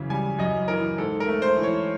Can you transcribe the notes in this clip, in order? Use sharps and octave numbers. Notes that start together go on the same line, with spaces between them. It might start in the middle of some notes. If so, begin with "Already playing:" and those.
Already playing: F#2 C#3 E3
G3 G#5
F#2 D#5
E3 A#4
G#2 A4
A#4
A3
C5
E3
C#5